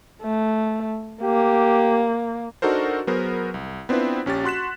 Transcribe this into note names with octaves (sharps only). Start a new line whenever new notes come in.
A3
A#3 G4
D4 D#4 F#4 A4 A#4 C5
F#3 B3 G#4 A#4 C5
C2
B3 C4 D4 E4 F4 B4
A#1 C#4 G4 A6
F#4 C6 F#6 B6 E7